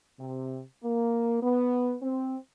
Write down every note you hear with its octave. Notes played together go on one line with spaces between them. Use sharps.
C3
A#3
B3
C4